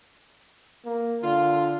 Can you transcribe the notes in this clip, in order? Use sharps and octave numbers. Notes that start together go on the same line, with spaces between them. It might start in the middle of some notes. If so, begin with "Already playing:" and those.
A#3
D3 F4